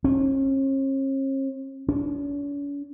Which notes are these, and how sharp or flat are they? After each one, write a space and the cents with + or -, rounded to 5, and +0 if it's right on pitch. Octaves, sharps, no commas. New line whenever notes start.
C#4 -45
C#4 +45